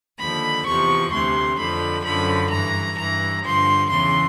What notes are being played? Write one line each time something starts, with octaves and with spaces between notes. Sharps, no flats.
D#2 D3 F3 B5
E2 C3 F3 C#6
D2 C3 E3 C6
F2 D3 F3 B5
F#2 D3 F3 B5
G2 E3 A#5
G2 E3 A#5
G2 D3 F3 C6
E2 C#3 E3 C6